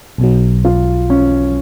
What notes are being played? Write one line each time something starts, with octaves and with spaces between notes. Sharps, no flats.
B1 B2 F#3
F4
C#4